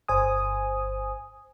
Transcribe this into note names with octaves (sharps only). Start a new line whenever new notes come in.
G1 C5 G#5 D#6